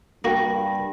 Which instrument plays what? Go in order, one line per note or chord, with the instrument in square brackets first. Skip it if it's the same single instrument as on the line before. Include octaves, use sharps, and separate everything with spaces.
[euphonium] G2 [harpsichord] A#3 F#4 [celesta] G5 A#6